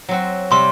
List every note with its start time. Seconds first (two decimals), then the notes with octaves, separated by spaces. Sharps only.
0.09 F#3 C4 F#4
0.50 C3 G3 C4 C6